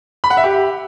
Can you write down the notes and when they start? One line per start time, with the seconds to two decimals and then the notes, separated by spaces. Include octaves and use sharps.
0.24 B5
0.30 F#5
0.37 E5
0.44 G4